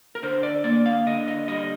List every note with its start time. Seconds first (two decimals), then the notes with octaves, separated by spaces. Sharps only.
0.15 A#4
0.23 D3 C5
0.43 D5
0.64 A#3 D5
0.86 F5
1.07 D3 D#5
1.28 D#5
1.48 G3 D#5